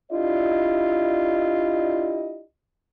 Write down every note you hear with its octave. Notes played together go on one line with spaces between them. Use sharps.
D4 E4 F4 G4 D5 D#5